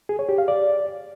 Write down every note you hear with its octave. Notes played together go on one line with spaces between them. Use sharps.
G#4
C#5
G4
F5
D5